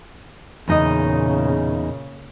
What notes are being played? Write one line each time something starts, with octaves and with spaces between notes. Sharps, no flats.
E2 A#2 C#3 D#4 D#5